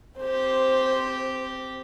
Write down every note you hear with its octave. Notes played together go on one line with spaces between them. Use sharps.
C4 G4 C5